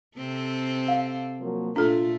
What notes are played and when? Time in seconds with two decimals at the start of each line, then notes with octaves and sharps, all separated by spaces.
0.18 C3 C4 A4
0.88 F5
1.40 F3 F#3 A#3
1.76 A#2 A3 D4 F4 A4